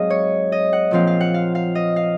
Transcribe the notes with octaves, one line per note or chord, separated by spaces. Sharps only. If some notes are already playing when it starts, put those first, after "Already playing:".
Already playing: G#2 F#3 C4 G#4 D#5 F5
C#5
D#5
F#5
A#2 F3 C4 F5
F5
F#5
F5
F5
D#5
F5